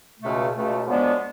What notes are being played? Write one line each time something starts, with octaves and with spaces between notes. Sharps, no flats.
C#2 B2 A3
C#2 B2 A3
F#2 F3 G#3 B3 D4